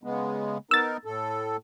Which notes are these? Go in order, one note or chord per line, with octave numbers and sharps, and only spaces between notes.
C#3 G#3 B3
B3 D#4 A#4 E6 A6
A2 A4